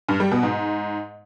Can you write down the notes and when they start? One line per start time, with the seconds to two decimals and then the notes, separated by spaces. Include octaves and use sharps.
0.09 G2
0.20 G3
0.31 B2
0.43 G#2